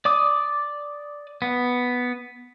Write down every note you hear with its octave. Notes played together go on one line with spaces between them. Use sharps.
D5 D6 D#6
B3